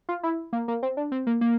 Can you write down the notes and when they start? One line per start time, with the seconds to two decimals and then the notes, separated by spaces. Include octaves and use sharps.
0.09 F4
0.23 E4
0.53 A#3
0.68 A#3
0.83 C4
0.97 D4
1.12 C4
1.27 A#3
1.41 A#3